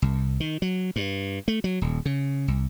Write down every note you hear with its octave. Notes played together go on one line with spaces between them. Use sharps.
C2
D#3
F#3
G2
A3
F#3
D#1
C#3
C2